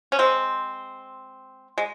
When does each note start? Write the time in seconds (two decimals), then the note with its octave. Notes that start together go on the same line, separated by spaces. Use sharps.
0.12 C#4
0.19 G#3 C4
1.78 G#3